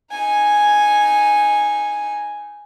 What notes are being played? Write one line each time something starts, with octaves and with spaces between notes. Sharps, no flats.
D#4 G#5